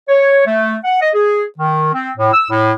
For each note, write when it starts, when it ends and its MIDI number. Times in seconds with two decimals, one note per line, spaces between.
0.09 0.44 73
0.46 0.76 57
0.85 0.97 78
1.01 1.10 75
1.14 1.44 68
1.59 1.92 51
1.93 2.11 60
2.17 2.31 45
2.33 2.46 88
2.50 2.72 45